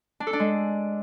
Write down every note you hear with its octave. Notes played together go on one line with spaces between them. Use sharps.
D4
A4
D4
G#3